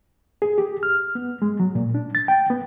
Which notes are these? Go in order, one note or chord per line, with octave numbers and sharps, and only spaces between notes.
G#4
G4
F6
B3
G#3
F#3
A#2
D4
A6
G5
B3